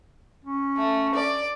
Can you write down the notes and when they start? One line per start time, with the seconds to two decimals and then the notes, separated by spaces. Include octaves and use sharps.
0.44 C#4
0.78 A3
1.15 D5